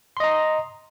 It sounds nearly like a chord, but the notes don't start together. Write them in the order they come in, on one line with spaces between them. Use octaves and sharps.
C6 D#5 A#5